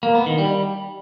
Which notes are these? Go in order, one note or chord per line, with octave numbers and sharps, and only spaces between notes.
A#3
B3
D#3
G3